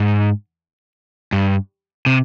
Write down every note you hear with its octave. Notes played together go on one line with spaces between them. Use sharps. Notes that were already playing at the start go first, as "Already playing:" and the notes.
Already playing: G#2
G2
C3